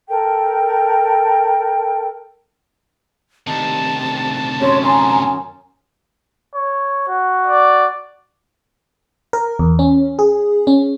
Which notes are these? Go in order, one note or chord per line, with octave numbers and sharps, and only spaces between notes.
A4 A#4 G5
D2 C3 D#3 A5
F#2 C#5 C6
G#5 A#5 C6 D#6
C#5
F#4
D5
A#4
E2
C#4
G#4
C#4